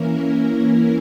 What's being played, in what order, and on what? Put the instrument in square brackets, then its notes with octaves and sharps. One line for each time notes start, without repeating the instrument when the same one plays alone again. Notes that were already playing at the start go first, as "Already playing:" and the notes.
Already playing: [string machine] E3 A#3 C#4 E4 A#4